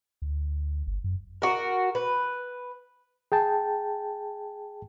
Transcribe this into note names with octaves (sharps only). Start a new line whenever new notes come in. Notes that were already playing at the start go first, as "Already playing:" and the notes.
D2
G1
F#2
F#4 A#4
B4
G#4 G5 A5